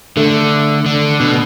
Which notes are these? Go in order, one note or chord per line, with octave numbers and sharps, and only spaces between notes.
D3 A3
D3
B2